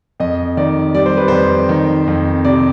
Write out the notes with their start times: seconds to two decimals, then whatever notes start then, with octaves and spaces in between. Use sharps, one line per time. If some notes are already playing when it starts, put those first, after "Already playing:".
0.20 F2 D#5
0.57 D#3 D5
0.95 G3 D5
1.06 C5
1.17 B4
1.28 F2 C5
1.69 D#3
2.08 F2
2.45 C3 D5